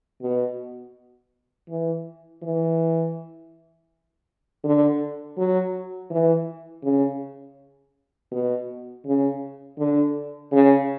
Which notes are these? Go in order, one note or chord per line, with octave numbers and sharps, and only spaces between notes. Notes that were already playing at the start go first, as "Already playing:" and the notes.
B2
E3
E3
D3
F#3
E3
C#3
B2
C#3
D3
C#3